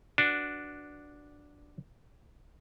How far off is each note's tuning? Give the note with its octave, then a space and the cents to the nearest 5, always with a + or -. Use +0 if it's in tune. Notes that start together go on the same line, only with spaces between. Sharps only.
D4 +0 F#4 +0 B4 +0